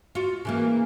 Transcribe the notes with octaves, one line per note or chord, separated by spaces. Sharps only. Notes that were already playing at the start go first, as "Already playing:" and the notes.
F4 F#4
C#3 E3 A#3